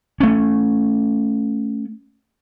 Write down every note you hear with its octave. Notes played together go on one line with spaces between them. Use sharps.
A3 C#4